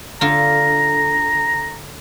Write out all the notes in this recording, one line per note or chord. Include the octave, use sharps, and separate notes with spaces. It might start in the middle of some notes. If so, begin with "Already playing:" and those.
D3 F4 A#5